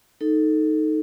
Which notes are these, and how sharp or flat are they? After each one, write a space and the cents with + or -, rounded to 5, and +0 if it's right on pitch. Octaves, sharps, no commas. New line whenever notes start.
D#4 +0 A4 +0